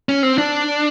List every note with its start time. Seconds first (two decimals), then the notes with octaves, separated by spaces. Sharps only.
0.09 C#4
0.23 C4
0.38 D4